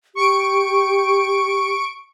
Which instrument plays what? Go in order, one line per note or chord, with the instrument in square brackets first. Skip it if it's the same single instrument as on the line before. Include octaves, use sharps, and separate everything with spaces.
[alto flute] G4 [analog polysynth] C#6 D7